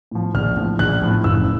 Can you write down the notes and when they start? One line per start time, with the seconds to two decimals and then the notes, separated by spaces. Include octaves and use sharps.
0.11 A2 F3
0.34 A#1 F6
0.57 A2 F3
0.79 A#1 F#6
1.02 A2 F3
1.24 F#1 E6